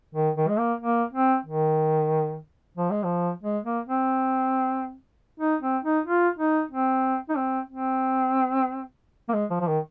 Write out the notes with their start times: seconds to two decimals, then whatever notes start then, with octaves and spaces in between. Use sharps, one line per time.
0.15 D#3
0.37 D#3
0.48 G#3
0.58 A#3
0.81 A#3
1.13 C4
1.46 D#3
2.77 F3
2.91 G#3
3.04 F3
3.43 G#3
3.64 A#3
3.87 C4
5.40 D#4
5.62 C4
5.84 D#4
6.06 F4
6.39 D#4
6.71 C4
7.29 D#4
7.37 C4
7.70 C4
9.29 A#3
9.34 G#3
9.50 F3
9.60 F3
9.67 D#3